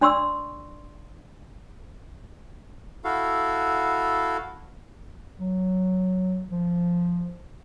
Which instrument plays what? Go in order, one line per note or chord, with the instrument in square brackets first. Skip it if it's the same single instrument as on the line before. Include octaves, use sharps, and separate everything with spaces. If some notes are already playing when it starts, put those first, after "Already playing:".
[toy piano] D4 D5 C6 C#6 E6
[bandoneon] E4 F#4 A4 F5
[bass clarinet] F#3
F3